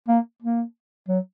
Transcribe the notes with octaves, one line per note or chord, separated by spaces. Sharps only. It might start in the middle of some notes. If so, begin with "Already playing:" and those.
A#3
A#3
F#3